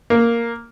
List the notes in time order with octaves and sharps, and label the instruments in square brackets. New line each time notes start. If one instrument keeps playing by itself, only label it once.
[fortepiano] A#3